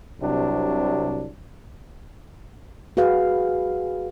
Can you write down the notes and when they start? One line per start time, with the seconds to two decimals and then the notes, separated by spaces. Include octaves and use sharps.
0.21 C2 C3 F#3 D4
2.97 F#4 G#4 B4 F5